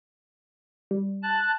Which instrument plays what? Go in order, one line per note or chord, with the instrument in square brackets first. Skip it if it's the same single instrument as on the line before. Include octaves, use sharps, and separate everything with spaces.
[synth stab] G3
[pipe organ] A5 F#6